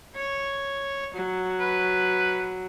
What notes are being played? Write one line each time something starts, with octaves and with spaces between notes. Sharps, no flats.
C#5
F#3
B4